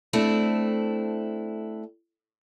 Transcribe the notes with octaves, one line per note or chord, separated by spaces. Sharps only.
A3 C4 D4 E4